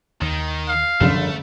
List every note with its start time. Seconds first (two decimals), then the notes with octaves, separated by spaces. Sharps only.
0.21 D#2 D#3
0.68 F5
1.01 F#1 F#2 D3 F3 G3 A3 E7